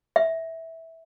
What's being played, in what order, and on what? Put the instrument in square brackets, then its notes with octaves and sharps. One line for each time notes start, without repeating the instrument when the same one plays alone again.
[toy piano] E5